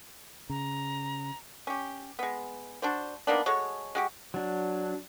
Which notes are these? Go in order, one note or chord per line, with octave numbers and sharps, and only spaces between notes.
C#3 A#5
C#4 G4
G#3 B3
D4 F#4 C5
D#3 A#3 B3 D4
G#3 F#4 A4 C#5
G#3 F#4 G4
F#3 D4